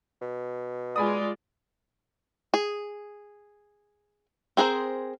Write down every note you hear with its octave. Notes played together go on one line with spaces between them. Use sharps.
B2
G#3 F4 D5 G#5 B5 D#6
G#4
C4 G#4 A#4 C5